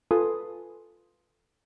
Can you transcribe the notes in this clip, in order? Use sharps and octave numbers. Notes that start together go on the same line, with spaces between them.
F4 A4 B4 G#5 C6 D#6